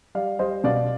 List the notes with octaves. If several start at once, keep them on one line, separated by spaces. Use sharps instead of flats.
G3 D5 F5
G3 C5 D#5
B2 D5 F5